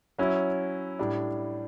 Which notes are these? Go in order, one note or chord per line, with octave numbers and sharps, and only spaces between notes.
F#3 C#4 E4
A2 G3 D4